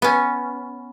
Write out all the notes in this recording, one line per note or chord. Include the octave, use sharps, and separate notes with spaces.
B3 C#4